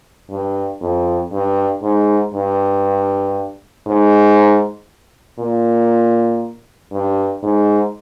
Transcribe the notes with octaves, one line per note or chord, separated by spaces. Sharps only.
G2
F2
G2
G#2
G2
G#2
A#2
G2
G#2